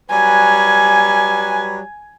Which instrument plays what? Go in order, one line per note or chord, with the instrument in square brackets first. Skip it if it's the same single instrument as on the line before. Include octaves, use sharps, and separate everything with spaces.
[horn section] F#3 G3 B4 [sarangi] G#5